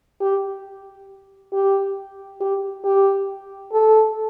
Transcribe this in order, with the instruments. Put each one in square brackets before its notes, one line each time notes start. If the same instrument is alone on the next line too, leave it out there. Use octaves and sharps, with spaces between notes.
[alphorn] G4
G4
G4
G4
A4